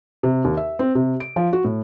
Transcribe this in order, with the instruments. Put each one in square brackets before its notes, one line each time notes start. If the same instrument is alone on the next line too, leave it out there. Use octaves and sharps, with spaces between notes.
[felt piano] C3
D#2
E5
C4
C3
D7
F3
F#4
A2